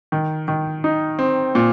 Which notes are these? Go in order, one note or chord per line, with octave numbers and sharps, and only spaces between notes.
D#3
D#3
D#4
C4
A#2